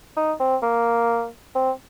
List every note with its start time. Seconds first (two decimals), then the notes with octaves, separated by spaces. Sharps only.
0.17 D#4
0.40 C4
0.63 A#3
1.55 C4